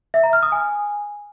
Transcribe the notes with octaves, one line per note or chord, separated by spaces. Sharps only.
E5
A#5
F6
D#6
G#5